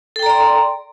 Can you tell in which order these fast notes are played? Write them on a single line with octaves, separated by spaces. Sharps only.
A4 G5 A#5 D5 C6